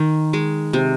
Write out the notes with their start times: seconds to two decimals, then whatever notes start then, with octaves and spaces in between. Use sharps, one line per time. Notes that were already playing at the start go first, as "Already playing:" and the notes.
Already playing: D#3
0.33 G#3
0.73 C3